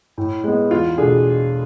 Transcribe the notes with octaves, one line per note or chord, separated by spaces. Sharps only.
A2
G#3 B3
E2 F4
B2 A3 D4 G#4